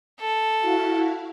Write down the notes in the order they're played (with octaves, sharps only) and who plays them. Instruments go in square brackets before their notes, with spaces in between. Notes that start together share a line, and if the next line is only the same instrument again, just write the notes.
[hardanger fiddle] A4
[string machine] E4 F#4 F5